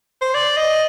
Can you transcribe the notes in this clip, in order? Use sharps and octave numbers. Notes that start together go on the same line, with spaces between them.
C5
D5
D#5